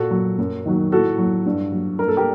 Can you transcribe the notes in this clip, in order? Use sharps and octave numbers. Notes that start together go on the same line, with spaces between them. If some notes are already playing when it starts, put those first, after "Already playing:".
Already playing: A#2 F#4 A4
F#3
F#2
D#3 F#3
A2 F#4 A4
F#3
G2
F#3
G2 A#4
A4
G4 A#4